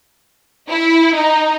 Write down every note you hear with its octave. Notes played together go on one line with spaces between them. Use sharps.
E4
D#4